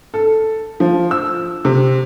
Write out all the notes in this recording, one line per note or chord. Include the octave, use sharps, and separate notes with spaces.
A4
F3
E6
C3